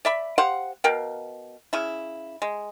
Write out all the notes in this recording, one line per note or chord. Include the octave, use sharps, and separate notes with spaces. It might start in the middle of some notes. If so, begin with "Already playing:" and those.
D5 E5 B5
G4 C5 F5 F#5
B2 A#4 F5 G5
C#3 E4
G#3